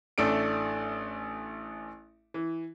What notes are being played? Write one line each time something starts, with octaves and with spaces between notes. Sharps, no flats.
A1 A3 D4 A4 D7
E3